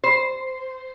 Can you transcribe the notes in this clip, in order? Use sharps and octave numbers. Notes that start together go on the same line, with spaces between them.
C5